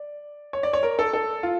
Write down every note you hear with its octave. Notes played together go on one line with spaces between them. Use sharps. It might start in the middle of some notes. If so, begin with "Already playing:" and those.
Already playing: D5
C#5
D5
C#5
A#4
A4
A4
F4